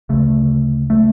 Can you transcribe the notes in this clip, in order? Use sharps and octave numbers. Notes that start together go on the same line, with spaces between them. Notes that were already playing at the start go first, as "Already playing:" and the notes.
D2 C#3 A3
A3